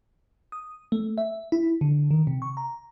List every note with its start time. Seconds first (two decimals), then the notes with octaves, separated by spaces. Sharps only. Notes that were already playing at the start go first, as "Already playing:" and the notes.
0.52 D#6
0.92 A3
1.18 E5
1.52 E4
1.81 D3
2.11 D#3
2.27 C3
2.42 C#6
2.57 A#5